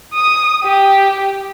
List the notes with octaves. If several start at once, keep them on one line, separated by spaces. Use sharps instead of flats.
D#6
G4